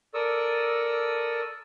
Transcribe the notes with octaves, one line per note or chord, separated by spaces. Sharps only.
A4 A#4 D5 C#6 D#6 E6